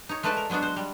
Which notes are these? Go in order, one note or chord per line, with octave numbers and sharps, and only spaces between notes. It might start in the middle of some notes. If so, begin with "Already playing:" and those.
D#4 C#5
G#3 A3 A4 B4 D5 A5
A#4
F#3 G#3 B3 D4 F#4
C5
G3